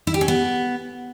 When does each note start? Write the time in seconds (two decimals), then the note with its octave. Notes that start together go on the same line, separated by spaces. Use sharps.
0.07 E4
0.14 G4
0.21 C#4
0.28 B3